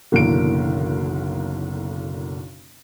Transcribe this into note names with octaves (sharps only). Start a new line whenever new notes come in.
F#1 B1 D3 E3 A#3 D7